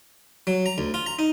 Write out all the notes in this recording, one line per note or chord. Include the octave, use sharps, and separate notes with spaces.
F#3
A#5
D2
F4
A#5
D#4